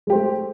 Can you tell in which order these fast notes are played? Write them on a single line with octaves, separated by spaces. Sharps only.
G#3 G4 C5 A3